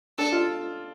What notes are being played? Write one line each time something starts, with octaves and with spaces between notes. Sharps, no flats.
D4 A4
F4